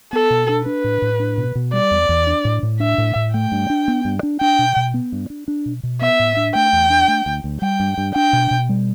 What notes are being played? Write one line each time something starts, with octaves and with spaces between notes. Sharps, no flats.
B3 A4
B2
D4
D4 B4
A2
A2
D4
B2
B2
G3 D5
E2
E2
D4
A2
A2
D4 E5
A2
A2
A3 G5
G2
D4
B3
G2
D4
D4 G5
B2
B2
B3
G2
D4
D4
B2
B2
B3 E5
A2
D4
A3 G5
E2
D4
A3
D2
D2
G3 G5
G2
G2
D4 G5
B2
B2
G3